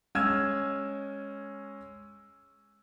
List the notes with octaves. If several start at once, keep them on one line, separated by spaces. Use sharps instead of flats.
G#3 C#4 E6 F6 G#6 E7